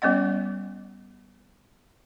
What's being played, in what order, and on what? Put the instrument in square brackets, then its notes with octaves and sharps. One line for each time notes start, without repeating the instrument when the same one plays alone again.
[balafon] G3 B3 C#4 D#5 F#5